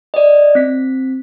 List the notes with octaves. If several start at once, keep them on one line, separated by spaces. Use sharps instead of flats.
D5 D#5
C4 B6